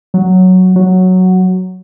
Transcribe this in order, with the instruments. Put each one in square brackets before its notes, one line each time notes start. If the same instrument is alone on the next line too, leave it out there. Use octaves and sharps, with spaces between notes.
[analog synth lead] F#3
F#3